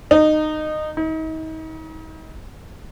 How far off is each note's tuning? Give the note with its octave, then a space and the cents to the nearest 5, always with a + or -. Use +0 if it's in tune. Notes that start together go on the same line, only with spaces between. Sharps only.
D#4 -20
D#4 +35